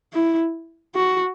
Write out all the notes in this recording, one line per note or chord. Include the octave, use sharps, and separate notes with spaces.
E4
F#4